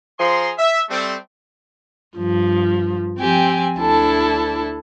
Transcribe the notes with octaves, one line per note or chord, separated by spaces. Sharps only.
F3 G#4 A#5 C6
E5
G3 A3 C4
G2 F3
F3 C4 G4 G#5
D2 D4 E4 A4 A5